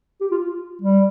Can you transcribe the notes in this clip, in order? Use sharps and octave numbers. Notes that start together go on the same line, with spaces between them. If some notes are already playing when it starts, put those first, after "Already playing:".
G4
F4
G3